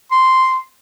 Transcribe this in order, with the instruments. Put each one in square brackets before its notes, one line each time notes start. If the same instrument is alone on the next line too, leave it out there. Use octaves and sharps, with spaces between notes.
[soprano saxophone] C6